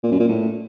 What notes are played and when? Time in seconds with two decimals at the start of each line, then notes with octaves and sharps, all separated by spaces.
0.03 A#2
0.12 F#2
0.20 A#2
0.28 A2